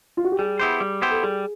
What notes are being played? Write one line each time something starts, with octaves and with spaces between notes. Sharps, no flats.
F4
F#4
G4
G3 G#4
B3 E4 G4 C5
G3
B3 E4 G4 C5
A4
G3 G#4